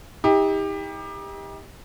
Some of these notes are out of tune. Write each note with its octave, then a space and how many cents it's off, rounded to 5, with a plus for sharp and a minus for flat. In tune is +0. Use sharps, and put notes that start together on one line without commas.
D#4 +40 G4 +25